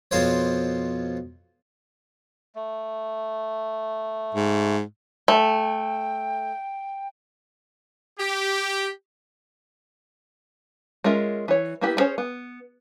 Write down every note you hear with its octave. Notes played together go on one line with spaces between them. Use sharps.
F2 B2 F4 C5 C#5
A3
G#2
A3 G5
G4
G#3 C#4 F4 A#4 E5
E3 C#5
A#3 B3 E4 G4 B4
B3 C#4 G#4 C5 C#5
B3